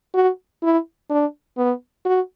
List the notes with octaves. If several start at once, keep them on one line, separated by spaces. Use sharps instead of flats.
F#4
E4
D4
B3
F#4